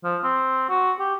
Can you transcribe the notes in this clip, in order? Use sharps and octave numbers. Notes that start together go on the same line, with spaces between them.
F3
C4
F#4
G4